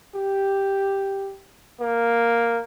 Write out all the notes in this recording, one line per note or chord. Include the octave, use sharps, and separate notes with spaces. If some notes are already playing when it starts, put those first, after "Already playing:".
G4
A#3